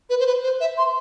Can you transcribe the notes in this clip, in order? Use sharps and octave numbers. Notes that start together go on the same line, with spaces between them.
B4
C5
B4
C5
E5
C6